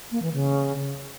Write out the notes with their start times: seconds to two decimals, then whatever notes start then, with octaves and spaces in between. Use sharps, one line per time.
0.11 A#3
0.22 E3
0.33 C#3